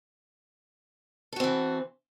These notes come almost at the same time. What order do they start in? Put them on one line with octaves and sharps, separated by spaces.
A4 F#4 C4 E3